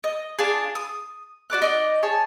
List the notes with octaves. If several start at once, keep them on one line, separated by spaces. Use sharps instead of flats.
D#5
D4 F4 G#4
D#6
F#4 D5 D6 F#6
D#4 D5 D#5
G#4 C#5 A5